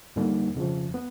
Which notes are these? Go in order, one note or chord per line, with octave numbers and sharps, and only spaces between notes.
F2 D3 G3 A#3 D#4
F2 C#3 F3
B3